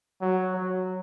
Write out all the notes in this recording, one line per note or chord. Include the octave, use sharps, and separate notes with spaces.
F#3
F#3